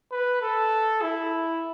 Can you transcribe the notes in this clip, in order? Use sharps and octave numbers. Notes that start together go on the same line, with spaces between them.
B4
A4
E4